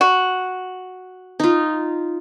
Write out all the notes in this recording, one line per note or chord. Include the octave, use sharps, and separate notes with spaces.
F#4
D#4 F4